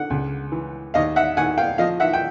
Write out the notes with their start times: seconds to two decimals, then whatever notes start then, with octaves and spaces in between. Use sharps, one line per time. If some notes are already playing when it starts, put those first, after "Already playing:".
Already playing: D3 F#5
0.10 C#2
0.52 E3
0.94 D#2 D#5 F5
1.16 E5 F#5
1.37 D#2 F#5 G#5
1.58 F5 G5
1.78 F3 D#5 F5
2.00 E5 F#5
2.13 G5